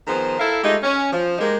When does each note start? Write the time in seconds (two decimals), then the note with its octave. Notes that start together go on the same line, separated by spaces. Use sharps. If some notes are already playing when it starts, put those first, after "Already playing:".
0.07 D#3 F3 B3 G#4 C5
0.39 E4 A4 A#4 E5 F5
0.63 G#3 A3 D#4 F4 G4
0.83 C#4
1.13 F3
1.39 G#3 A#3 D#4 G4 A#4